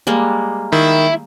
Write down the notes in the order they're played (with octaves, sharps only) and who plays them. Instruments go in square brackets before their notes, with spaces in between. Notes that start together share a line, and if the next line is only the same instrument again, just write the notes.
[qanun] G3 G#3 A#3
[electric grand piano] D#3 [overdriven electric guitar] E4